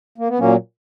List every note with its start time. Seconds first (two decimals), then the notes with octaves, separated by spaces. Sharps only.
0.18 A#3
0.28 B3
0.39 A#2 F#3 A#3 C#4